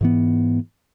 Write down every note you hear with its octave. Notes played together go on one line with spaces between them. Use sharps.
G#2 E3 B3